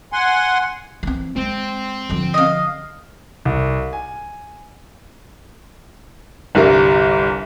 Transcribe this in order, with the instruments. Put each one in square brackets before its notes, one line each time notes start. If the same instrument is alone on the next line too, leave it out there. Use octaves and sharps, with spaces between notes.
[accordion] F#5 G#5 C6
[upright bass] E3 C4
[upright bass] G#3 [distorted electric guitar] C4
[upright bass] D3 F3
[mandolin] D#5 F5
[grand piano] C2
G#5
[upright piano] G1 C2 G3 A#4